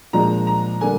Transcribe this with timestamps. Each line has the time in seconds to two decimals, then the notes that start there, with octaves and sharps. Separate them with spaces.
0.13 A#2 F3 G#3 D4 A#5
0.47 A#5
0.81 D3 G3 A#3 D4 G#5